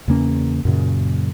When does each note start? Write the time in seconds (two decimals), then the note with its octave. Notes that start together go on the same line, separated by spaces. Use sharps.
0.08 E2 C#3 A#3 C#4
0.65 F#2 A#2 C#3